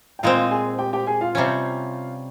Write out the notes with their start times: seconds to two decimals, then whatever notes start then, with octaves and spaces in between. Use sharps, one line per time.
0.19 G5
0.23 A#2 G#3 C4 F4 F5
0.51 G#4 G#5
0.79 G4 G5
0.93 G4 G5
1.07 G#4 G#5
1.21 F4 F5
1.35 C3 G3 C#4